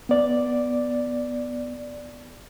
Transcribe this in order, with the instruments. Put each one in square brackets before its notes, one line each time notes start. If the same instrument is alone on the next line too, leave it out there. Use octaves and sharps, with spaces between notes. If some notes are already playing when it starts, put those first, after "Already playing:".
[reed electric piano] B3 D5